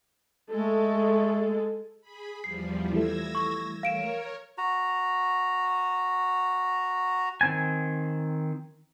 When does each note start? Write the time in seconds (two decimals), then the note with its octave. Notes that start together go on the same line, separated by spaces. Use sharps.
0.51 G#3 A3 A4
2.01 G#4 B5
2.44 E2 F3 G3 C7
2.93 E3 G3 A3 E6 G#6 A#6
3.35 C#6
3.83 A#4 C#5 F5 D7 E7
4.58 F#4 A#5
7.41 D#3 C4 G#5